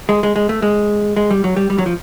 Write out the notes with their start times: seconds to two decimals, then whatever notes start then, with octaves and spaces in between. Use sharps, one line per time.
0.09 G#3
0.23 G#3
0.36 G#3
0.49 A3
0.62 G#3
1.17 G#3
1.31 G3
1.44 F#3
1.56 G3
1.70 G3
1.78 F#3
1.86 F3